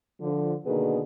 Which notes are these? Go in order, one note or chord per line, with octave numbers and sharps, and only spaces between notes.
D3 F3
B2 D3 D#3 A#3 B3 G#4